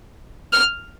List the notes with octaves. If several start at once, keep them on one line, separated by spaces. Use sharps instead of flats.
F6